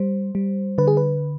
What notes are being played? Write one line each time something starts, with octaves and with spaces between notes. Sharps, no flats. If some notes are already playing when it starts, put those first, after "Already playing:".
Already playing: G3 C5
G3
D3 B4
G#4
B4